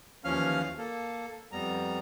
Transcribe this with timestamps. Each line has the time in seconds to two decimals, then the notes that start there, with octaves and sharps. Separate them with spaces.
0.24 D#2 E3 F3 C#4 F5 F6
0.78 A#3 A4
1.52 F2 G3 B3 A#5